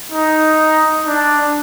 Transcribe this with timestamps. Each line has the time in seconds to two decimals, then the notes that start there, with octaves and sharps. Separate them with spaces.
0.12 D#4
1.06 D4